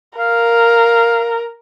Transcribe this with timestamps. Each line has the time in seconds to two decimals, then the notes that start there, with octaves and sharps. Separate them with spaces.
0.19 A#4 F5